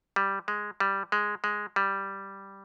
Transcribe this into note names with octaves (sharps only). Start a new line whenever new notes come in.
G3
G#3
G3
G#3
G#3
G3